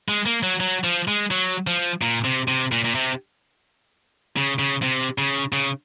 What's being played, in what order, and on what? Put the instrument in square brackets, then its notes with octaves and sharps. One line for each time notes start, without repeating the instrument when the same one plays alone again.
[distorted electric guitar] G#3
A#3
F#3
F#3
F3
G#3
F#3
F3
A#2
C3
C3
A#2
A#2
C3
C#3
C#3
C3
C#3
C#3